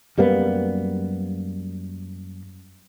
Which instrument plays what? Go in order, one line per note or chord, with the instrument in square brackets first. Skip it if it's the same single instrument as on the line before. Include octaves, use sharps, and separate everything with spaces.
[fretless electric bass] F#2 G3 A#3 B3